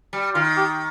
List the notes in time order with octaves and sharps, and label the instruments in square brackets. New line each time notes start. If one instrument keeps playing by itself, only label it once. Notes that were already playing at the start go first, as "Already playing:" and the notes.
[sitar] G3
[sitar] D#3 [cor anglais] F4
[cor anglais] G4